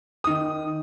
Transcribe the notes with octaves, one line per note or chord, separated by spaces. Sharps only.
D#3 D#6